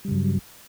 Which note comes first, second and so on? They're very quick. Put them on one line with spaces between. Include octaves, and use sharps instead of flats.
G3 C#3 G2 F#3